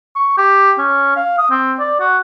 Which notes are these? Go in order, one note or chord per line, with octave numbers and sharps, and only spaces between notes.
C#6
G4
C#4
F5
D#6
C4
D5
F#4